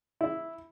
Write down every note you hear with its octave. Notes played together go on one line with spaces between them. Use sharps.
E4